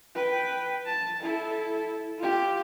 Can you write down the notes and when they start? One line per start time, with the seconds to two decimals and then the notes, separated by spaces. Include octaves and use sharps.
0.15 B4 G5
0.86 A5
1.21 E4 A4
2.18 F4 G4